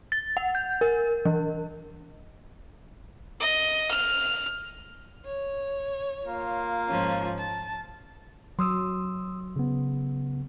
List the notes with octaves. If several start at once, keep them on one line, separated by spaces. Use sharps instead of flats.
A6
F#5
G6
A#4
E3
D#5
F6
C#5
A#3 F4
G#2 F3 C#4
A5
F#3 C6 D#6 E6
C#3 B3